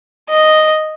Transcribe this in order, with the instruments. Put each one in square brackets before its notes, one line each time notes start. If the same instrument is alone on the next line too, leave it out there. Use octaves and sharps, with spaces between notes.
[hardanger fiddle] D#5